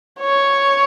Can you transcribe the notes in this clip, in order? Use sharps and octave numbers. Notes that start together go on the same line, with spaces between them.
C#5